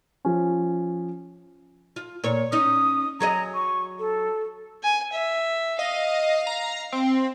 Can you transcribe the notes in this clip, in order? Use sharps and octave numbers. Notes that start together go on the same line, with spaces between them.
F3 C#4
F4
A#2 C#5
C#4 D#4 D#6
F#3 G#4 D#5 A#5
C#6
A4
G#5
E5
D#5 F5
A#5
C4